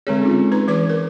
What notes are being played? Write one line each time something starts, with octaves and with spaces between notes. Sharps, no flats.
D3 G#3 C4 G#4 A4 C#5
C#4 D#4 F4
D#4 B4 A#5
E3 B4 D6
A#4